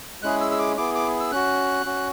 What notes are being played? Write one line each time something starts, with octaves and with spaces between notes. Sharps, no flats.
G#3 C#4 E4 G#4 F#6
E6
E6
D6
B3 E4 G#4 D6
D6
E6
C#4 F#4 F#6
C#4 F#4